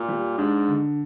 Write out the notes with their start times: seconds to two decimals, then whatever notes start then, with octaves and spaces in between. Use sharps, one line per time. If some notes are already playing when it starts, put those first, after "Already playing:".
Already playing: A#2
0.08 G3
0.38 G#2 D4
0.68 D3